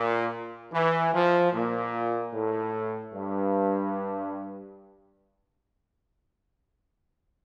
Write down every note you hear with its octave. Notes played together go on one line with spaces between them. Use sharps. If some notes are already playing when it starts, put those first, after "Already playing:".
Already playing: A#2
E3
F3
A#2
A2
G2